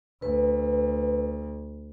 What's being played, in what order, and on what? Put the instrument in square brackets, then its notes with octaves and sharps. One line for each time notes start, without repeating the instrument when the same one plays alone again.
[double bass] D2 [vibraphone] B4